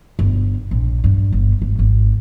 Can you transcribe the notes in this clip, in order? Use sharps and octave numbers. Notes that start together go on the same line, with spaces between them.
G1
A#1
G2
G1
G#1
G#1